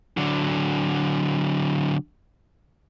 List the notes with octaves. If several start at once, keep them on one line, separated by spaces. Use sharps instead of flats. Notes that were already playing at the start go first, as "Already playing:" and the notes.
D3 F#3